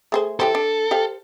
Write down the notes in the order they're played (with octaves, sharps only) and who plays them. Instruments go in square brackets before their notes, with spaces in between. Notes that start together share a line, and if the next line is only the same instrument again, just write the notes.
[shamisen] A3 G#4 C5
[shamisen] E3 G4 C5 [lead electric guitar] A4
[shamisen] D4
G4 C5 F5